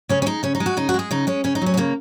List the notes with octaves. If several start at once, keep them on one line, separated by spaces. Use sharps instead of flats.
C#3 C#4
C#4
G#3 D#4
C#3 C#4
D#4
G#3
F#4
C#3 D#4
F#4
G#3 G#4
C#3 D#4
G#3 C#4
C#3 C#4
D#4
F#3 C#4
C#4
C#3 A#3